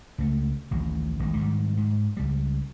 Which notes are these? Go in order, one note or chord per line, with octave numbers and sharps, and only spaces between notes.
C#2 A3
A1 D2 D#3 F#3
A1 D#2 D#3 G#3
G#2 D#3 F#3 G3
G#2
C#2 G3